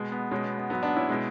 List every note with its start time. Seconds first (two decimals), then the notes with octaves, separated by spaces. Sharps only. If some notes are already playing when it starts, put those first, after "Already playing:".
Already playing: B2 G#3
0.12 B3
0.31 B2 G#3 C#4
0.44 B3
0.58 B3
0.70 G#2 F#3 B3
0.83 B3 D4
0.96 C#4 E4
1.09 B2 G#3